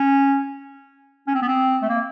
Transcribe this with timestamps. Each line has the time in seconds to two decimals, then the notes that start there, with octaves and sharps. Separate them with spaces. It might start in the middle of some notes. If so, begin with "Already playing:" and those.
Already playing: C#4
1.27 C#4
1.34 C4
1.42 B3
1.48 C4
1.82 A3
1.89 A#3